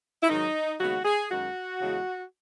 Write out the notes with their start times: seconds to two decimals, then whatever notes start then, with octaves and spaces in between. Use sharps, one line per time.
0.23 E4
0.29 G#2 D#3 F#3 D#4
0.80 D#2 C#3 G#3 B3 F#4
1.05 G#4
1.30 F#2 D#3 G#3 F#4
1.80 E2 C#3 G#3